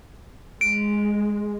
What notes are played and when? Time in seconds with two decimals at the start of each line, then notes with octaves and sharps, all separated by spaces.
0.61 G#3 D7